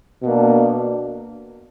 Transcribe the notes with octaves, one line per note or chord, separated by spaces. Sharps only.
B2 A#3 D4